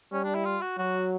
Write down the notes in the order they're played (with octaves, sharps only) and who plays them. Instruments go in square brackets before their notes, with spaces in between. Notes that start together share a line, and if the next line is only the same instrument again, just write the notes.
[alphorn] G3 [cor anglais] C#4
[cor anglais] D4
E4
F4
F#4
[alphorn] F#3 [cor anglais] F#4